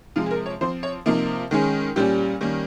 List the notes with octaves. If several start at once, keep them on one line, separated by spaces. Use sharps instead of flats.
C3 F3 G#3 F4
G#4
A#4
C#5
F3 C4 C5
C#5
C3 F3 A#3 D#4
D#3 G#3 C#4
A#2 G3 C#4 G4
D#3 G3 A#3 C#4